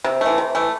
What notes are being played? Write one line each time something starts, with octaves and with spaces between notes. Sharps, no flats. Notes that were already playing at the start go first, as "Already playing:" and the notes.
C3
E3 A3
C3
E3 A3